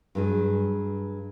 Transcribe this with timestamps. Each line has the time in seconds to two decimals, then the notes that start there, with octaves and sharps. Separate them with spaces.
0.15 G2 F#3 G#4